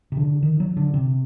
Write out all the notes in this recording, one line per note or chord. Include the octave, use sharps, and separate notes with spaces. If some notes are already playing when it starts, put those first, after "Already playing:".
C3
D3
D#3
F#3
D3
C3